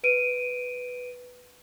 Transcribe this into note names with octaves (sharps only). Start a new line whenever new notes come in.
B4 D7 D#7